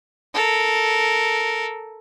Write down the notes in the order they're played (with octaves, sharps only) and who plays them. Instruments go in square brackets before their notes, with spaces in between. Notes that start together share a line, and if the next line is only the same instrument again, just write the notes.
[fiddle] A4 A#4